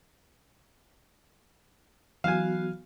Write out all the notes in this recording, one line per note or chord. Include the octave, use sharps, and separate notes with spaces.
E3 F#3 B3 F#4 F5 G#5